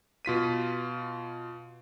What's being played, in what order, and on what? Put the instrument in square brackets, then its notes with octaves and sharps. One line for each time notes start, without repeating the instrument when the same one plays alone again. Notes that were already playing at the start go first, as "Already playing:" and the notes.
[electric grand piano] B2 F4 B6 D#7